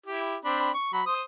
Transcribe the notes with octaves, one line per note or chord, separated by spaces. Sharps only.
E4 G4
C4 D4 B5
C#6
F#3 B5
C5 D#6